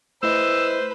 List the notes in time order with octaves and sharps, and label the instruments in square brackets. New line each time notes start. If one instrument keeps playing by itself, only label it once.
[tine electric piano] A3 E4 D#5 [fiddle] B4 [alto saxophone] C5 [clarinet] E6